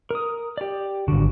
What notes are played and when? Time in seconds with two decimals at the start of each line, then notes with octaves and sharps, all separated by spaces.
0.11 A#4 D#6
0.57 G4 D5
1.08 G#1 D3 F#4